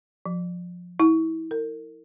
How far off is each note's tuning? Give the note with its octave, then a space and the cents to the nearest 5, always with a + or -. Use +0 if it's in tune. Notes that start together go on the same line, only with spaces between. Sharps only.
F3 +20
E4 -30
A#4 -35